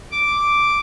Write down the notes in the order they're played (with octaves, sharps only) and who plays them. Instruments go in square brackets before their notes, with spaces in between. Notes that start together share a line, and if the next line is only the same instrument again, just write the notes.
[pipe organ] D6